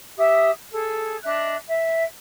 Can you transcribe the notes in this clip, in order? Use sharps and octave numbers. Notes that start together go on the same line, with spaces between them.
G4 E5 D#6
G#4 A4
D4 D#5 E5 F#6
E5